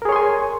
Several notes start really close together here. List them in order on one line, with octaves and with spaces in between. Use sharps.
A#4 G#4 C#5 C6 G#5